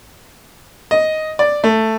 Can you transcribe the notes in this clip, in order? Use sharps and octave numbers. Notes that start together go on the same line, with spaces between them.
D#5
D5
A3